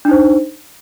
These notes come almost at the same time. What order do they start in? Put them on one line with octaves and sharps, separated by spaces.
D4 D#4 C5